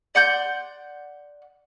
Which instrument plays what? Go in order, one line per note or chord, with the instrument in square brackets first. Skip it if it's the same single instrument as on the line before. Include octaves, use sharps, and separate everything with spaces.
[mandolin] D5 F#5 C6 G6